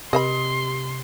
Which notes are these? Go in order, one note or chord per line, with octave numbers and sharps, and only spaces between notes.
C3 G4 D#5 E5 B5 C6